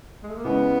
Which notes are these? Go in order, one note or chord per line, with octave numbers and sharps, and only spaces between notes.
G#3
A3
A#3
C#3 E3 G#3 B3 C#4